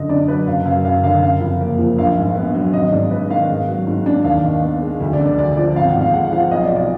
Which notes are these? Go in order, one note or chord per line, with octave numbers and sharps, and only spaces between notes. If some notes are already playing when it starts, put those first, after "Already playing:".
Already playing: F#2 D3 D#5
D4 D5
F#3 B4
F#1 F5
F#2 F5
F#1 F5
D3 F5
F#1 F5
F2
A#3
F3
A#1 F5
G#2
B3
F#3
G#1 D#5
G#2 D5
G#3 B4
D#3 F5
G#2
F#3
G#2
D4
D#2 F5
D#3
B3
G#3
D2
D5
D3
D5
D2 D5
F3 D5
G#1 F5
F#5
G#2
F5
G#3 F#5
F3 F5
B1 D#5
D5
B2
D5